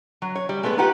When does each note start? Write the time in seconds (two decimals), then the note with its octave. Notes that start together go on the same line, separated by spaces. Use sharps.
0.22 F#3
0.35 C#5
0.49 G3
0.63 G#3 A3 B3 B4
0.78 D#4 F4 G4 B4 F#5